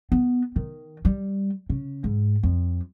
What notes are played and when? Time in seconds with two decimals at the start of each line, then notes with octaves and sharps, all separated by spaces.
0.12 B3
0.56 D#3
1.05 G3
1.70 C#3
2.04 G#2
2.43 F2